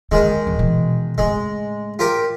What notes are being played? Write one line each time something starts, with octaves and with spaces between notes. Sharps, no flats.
D#2 D3 D#3 G#3
D#1 D#2
B2 E3
A2 C#3 G#3
F4 G4 A#4